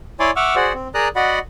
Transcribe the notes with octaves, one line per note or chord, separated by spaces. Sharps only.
E4 C#5 D5 G#5 C6 D6
E5 F#5 C#6 D6 E6 F6
F#4 G#4 C5 D5 F#5
C4
G#4 A#4 D5 A#5 D#6 F#6
F#4 D5 D#5 F#5 B5